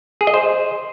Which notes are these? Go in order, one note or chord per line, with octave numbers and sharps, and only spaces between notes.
G#4
D#5
C5